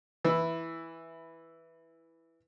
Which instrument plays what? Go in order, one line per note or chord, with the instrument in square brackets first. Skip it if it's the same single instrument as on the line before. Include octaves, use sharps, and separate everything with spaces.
[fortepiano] E3 E4